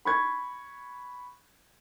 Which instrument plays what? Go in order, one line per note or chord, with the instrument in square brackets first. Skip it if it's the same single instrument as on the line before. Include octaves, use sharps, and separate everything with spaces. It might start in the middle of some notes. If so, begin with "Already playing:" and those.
[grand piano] B5 C#6 G#6